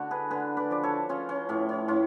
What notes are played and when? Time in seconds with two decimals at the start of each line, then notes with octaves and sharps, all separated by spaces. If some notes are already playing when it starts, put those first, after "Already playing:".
Already playing: D3 D4 F#4
0.11 G#4 B4
0.30 D3 G#4 B4
0.57 B4 D5
0.71 F3 D5
0.83 A4 C#5
1.09 C#4 F4 G#4
1.29 C#4 F4
1.49 A2 C#4
1.69 C#4
1.88 A2 C#4 F4